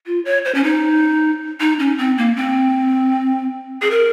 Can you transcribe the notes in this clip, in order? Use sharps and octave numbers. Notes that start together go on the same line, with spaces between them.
F4
C#5
C5
C#4
D#4
D#4
C#4
C4
A#3
C4
G#4
A#4